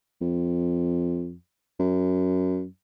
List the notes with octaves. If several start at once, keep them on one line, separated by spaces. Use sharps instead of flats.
F2
F#2